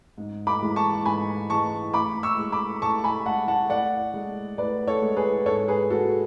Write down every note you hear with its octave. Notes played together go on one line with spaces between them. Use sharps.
G#2
B5 D6
E3 G#3
A5 C#6
G#2 G#5 B5
E3 G#3 A5 C#6
A2 B5 D6
C#6 E6
G#3
B5 D6
A2 A5 C#6
G#5 B5
G#3 F#5 A5
F#5 A5
A2 D5 F#5
G#3
A2 B4 D5
A4 C#5
G#3
G#4 B4
G#2 A4 C#5
G#4 B4
G#3 F#4 A4